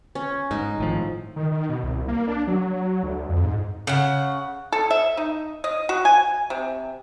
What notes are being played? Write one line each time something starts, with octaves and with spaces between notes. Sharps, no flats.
C#4
G#2 D#4
G#1 A2 F3
D#3
D#3
B2
C2
A#3
D4
F#3
D2
F2
G#2
C#3 F#5
A4
E5
D#4
D#5
F#4
G#5
C3